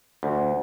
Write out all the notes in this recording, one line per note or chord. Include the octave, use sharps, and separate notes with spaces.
D2